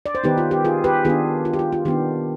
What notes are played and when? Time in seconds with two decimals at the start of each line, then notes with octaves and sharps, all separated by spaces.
0.06 D5
0.15 C5
0.24 D#3 B3 D#4 G4 B4
0.38 F4
0.51 G4
0.65 F4 G#4
0.84 G4 B4
1.05 D#3 B3 D4 F4 G#4
1.45 F4
1.53 G4
1.59 F4
1.73 F4
1.85 D#3 B3 D4 G4